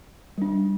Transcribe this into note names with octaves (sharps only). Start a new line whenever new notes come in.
G3 D4